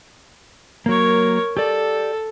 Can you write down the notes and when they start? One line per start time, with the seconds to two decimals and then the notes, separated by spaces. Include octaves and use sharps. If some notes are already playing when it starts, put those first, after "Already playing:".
0.86 F#3 A#3 A#4 C#5
1.57 G4 A4 D5